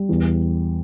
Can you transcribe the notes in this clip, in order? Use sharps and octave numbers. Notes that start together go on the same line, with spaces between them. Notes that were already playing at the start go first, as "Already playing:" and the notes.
Already playing: G3
E2